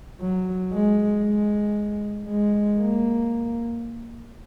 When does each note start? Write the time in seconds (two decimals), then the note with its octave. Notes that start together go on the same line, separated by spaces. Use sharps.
0.21 F#3
0.73 G#3
1.24 G#3
2.29 G#3
2.80 A#3